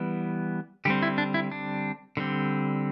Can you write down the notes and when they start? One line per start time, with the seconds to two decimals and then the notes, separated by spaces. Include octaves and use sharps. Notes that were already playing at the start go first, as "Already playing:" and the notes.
Already playing: E3 G3 B3
0.85 D3 G3 C4 G4
1.03 E4
1.18 D4
1.34 E4
1.51 D4
2.17 D3 G3 C4